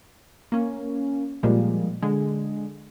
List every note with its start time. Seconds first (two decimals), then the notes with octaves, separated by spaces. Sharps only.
0.52 A#3 C#4
1.43 A#2 F3 G3 G#3 A#3
2.02 D3 G#3